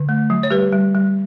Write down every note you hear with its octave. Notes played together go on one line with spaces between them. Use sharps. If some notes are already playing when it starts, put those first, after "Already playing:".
Already playing: D3
A3
F#3
C#5
G3 G4 B4
G3
G3